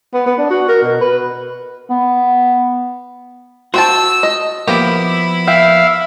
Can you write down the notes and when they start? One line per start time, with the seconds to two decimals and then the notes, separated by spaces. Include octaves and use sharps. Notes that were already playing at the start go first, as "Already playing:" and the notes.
0.14 B3
0.26 B3
0.38 D4
0.50 F#4
0.69 A#4
0.82 B2
1.01 B4
1.90 B3
3.74 F#4 C5 G5 A5 E6
4.23 D#5
4.68 F3 A#3 B3 E4 G4
5.47 E5 F5 G5